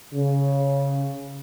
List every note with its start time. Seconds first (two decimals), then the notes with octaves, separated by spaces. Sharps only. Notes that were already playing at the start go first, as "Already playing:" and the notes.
0.14 C#3